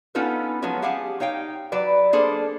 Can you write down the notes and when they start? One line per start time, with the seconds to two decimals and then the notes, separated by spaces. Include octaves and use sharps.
0.15 B3 C#4 D#4 F4 A4 B4
0.62 F3 F#3 G#3 B3 C#4 F#4
0.82 G4 G#4 F5 F#5 G#5 A5
1.20 D#4 C#5 F5 G5
1.72 F#3 B4 D5
2.13 A#3 D4 G#4 A4 C5